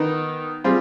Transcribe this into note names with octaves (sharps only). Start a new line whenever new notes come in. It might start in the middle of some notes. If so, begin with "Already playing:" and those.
Already playing: D#3 B3 D#4
G3 C4 F4 G#4